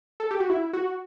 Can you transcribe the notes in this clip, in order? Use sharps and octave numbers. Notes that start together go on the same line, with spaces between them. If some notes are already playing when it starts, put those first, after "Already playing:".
A4
G4
F#4
E4
F#4